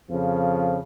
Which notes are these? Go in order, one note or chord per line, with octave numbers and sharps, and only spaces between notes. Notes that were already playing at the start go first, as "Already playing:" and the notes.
F2 C#3 F3